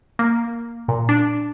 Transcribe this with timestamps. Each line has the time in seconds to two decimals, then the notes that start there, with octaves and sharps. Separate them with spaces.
0.19 A#3
0.88 A#2
1.09 D4